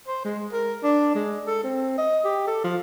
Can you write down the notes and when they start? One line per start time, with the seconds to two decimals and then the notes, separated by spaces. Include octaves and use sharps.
0.08 C5
0.25 G#3
0.53 A#4
0.83 D4
1.15 G#3
1.47 A4
1.64 C4
1.98 D#5
2.25 G4
2.47 A4
2.64 F3